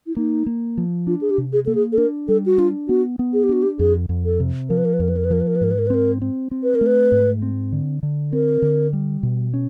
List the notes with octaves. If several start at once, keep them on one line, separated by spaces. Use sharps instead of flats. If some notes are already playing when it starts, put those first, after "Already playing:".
E4
A#3 D#4
A#3
F3
D4 F4
G#4
G4
C3
G#4
A#3 A4
G#4
A4
D4 A#4
G3 A4
F#4
D4 F4
B3 F#4
B3
G#4
G4
D4 F#4
G4
F2 G#4
F2
A4
C3
F3 A#4
B4
A#4
B4
F2 A#4
B4
A#4
B4
F3 A#4
B4
A#4
B4
G#2 A#4
B4
A#4
B4
C4 A#4
C4
C4
B4
A#4
A3
B4
G#2
C4
D3
D3
C4 A#4
D3
G3
B2
C#4